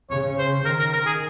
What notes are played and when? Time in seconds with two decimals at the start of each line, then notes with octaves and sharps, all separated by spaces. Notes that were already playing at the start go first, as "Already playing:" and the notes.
0.10 C#3 C#5
0.38 C5
0.65 D#3 A#4
0.79 A#4
0.93 A#4
1.06 G#4